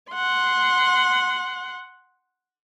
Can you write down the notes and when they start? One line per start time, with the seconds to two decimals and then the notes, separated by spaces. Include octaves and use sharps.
0.12 F#5 C6